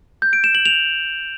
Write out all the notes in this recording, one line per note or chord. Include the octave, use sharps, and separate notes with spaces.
G6
D7
E7
F#7
F7